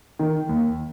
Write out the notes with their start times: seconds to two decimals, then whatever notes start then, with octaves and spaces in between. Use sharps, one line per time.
0.19 D#3
0.49 D#2